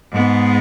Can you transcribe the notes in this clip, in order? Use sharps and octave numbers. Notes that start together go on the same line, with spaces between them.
G#2 G#3 B3